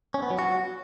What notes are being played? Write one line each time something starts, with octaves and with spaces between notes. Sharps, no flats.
C#4
B3
F#3
F#4